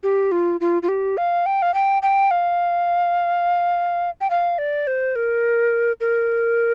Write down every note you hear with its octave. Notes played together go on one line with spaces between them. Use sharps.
G4
F4
F4
F4
G4
F5
G5
F5
G5
G5
F5
G5
F5
D5
C5
A#4
A#4